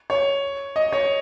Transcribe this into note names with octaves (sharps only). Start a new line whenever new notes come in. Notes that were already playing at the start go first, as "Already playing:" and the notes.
C#5
D#5
C#5